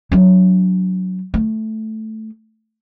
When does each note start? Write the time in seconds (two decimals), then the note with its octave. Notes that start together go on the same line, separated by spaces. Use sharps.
0.12 F#3 D4
1.34 A3